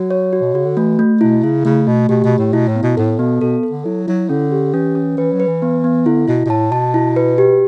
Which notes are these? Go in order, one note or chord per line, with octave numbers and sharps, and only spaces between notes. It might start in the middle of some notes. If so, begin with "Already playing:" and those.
Already playing: F#3 F#4
C#5
F#4
B2
C#3 F#4
D3
E3 A3
A3
B2 E4
C#3 E4
C#3 A3
B2 A3
B2 G4
B2
A3
A2
B2 E4
A2
B3
B2
A2 A4
B2 B3
B2 A4
A4
D3
F#3 E4
F#3 E4
D3 C#4
G4
E3 C#4
C#4
E3 B4
F#3
B4
E3
B3
B3
D3 E4
B2 E4
B2
A2 A5
B2 A5
E4
B4
G4